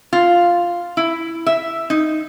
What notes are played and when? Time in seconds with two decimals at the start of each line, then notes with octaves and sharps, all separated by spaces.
0.13 F4
0.97 E4
1.46 E5
1.90 D#4